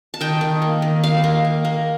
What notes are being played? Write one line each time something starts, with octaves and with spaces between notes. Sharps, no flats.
A5
D#3 G5
D#3
A#3
D#3
D#3 F5
A#3
A#3
A#3